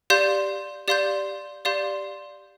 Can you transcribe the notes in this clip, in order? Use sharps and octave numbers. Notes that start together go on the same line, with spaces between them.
G4 D5 F5 C6 G6
G4 D5 F5 C6 G6
G4 D5 F5 C6 G6